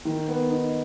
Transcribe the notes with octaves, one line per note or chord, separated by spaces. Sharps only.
D#3
B3
D#4